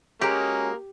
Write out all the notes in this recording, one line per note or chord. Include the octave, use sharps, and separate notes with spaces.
G#3 A#3 C#4 F#4 G4 A#5